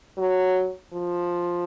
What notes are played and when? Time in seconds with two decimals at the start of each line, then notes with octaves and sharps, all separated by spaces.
0.18 F#3
0.93 F3